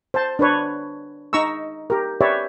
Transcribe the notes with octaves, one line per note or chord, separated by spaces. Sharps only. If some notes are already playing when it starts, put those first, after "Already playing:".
C5 A5
D4 B4 C#5
D#4 A#5 C#6 E6
G4 A#4
G4 B4 C#5 D5 E5